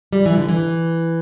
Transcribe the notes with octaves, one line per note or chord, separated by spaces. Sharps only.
G3
E3
D3
E3